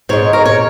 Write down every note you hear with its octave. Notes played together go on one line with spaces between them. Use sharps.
G#2 G#3 C#5
A#4
C#5